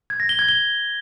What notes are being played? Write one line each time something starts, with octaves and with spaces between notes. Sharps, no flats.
G#6
A#6
G7
G#6
G7